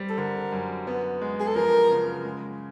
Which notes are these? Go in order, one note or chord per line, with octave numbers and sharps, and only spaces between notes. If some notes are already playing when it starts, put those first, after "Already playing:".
Already playing: G3 C4
A4
D3 A#4
F#2
B3
G#3
G#4
A4
F3 A#4
C#3
G#3